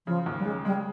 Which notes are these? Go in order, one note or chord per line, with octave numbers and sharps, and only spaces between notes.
C#3 F3
D#2
G3
C#3 G#3
G3 G#3